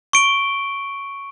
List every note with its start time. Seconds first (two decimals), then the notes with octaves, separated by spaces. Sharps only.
0.13 C#6 D7 G7